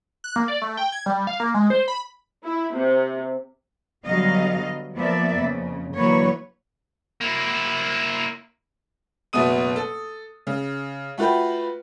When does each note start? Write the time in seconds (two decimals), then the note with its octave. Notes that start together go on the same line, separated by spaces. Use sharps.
0.24 F#6
0.36 A#3
0.48 D5
0.62 A3
0.77 G5
0.92 G#6
1.06 G3
1.27 F5
1.40 A#3
1.54 G#3
1.70 C5
1.88 B5
2.44 E4
2.74 C3
4.06 D3 F#3 G3 B3 D#5 F5
4.95 F3 A#3 B3 D5 E5
5.38 F2 C#3
5.96 D3 E3 F#3 A#3 B4 C#5
7.21 A#3 E4
9.33 F#1 B2 A3 B3 D#6 D#7
9.76 A4
10.47 C#3
11.18 A3 F4 F#4 B4 G5